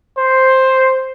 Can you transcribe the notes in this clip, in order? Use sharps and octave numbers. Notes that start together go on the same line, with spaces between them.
C5